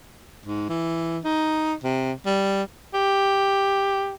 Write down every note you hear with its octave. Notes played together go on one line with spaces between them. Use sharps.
G#2
E3
D#4
C3
G3
G4